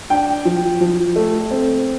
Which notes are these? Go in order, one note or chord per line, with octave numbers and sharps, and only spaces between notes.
D4 G5
F3
F3
A3
C4